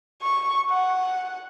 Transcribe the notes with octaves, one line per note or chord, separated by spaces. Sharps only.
C#6
F#5